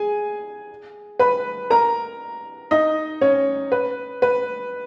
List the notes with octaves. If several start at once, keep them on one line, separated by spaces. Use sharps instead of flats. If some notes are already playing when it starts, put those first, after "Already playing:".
Already playing: G#4 G#5
B4 B5
A#4 A#5
D#4 D#5
C#4 C#5
B4
B4